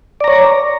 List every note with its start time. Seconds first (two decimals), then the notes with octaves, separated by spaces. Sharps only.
0.21 D5
0.24 A#5
0.28 C#5